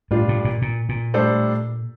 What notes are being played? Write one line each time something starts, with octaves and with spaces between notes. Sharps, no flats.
A2 G3 D4 F4
A2
A#2
A#2
A#2
A2 G3 D4 A4 C5